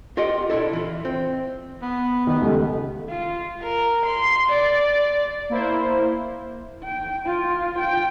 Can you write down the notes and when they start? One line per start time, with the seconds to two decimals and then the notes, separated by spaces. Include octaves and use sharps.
0.17 F4 G4 D#5 F#5 G5
0.50 A#2 D3 E4 A4
0.73 E3 F4
1.05 C4
1.82 B3
2.27 D#3 B3
2.42 C#2 G3 A4
3.09 F4
3.63 A#4
4.05 C6
4.49 D5
5.50 A#3 E4 C5
6.84 G5
7.26 F4
7.79 G5